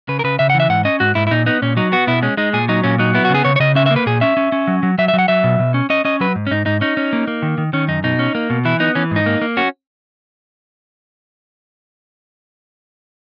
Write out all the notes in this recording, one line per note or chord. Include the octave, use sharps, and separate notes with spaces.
C#3 B4
A#4
C#3 B4
C#3 E5
F#5
E3
E5
G#2 F#5
C#4 D#5
G#2 F#4
G#2 E4
E4
A#2 D#4
B3 D#4
A#2 C#4
F#3 D#4
B3 F#4
B2 E4
G#3 C#4
G#3 D#4
A#2 G#4
F#3 D#4
A#2 C#4
F#3 D#4
B3 E4
F#4
C#3 G#4
C#3 C#5
C#5
C#3 D#5
C#4 E5
E5
A#3
B4
A#2 G#4
C#4 E5
C#4
C#4
F#3
F#3
F#3 E5
E5
F#3
F#5
F#3 E5
B2
B2
C#4
C#4 D#5
C#4 D#5
F#3 B4
G#2
C#4
G#2 D#4
G#2 D#4
C#4 D#4
C#4
A#3
A#3
D#3
D#3
D#3 C#4
F#2 D#4
B2 D#4
C#4
A#3
B2
E3 E4
B3 D#4
E3 C#4
G#2 D#4
A#3
A#3
C#4 F#4